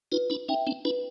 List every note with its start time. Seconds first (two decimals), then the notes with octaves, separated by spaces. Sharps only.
0.12 D#4 F4 B4
0.30 D4 E4
0.48 C#4 D#4 E5 G5
0.67 C4 D4
0.85 D4 E4 B4